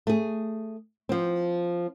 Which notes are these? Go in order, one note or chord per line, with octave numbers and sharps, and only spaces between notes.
A3 G#4
F3 C4